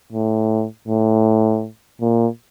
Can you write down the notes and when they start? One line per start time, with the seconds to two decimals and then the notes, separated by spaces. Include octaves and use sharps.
0.13 A2
0.88 A2
2.01 A#2